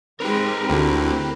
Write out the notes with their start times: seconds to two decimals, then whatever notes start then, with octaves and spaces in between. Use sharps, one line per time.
0.20 G#3 C4 D#4 G4 A#4 B4
0.70 D2 E4